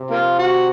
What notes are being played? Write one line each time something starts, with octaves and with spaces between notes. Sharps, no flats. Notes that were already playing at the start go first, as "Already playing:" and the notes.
Already playing: C3
A#3 F4
F#4